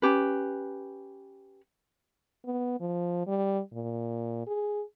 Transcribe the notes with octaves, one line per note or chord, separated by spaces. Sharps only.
C#4 G4 B4
B3
F3
G3
A#2
G#4